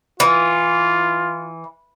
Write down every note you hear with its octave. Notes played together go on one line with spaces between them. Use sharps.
E3 F4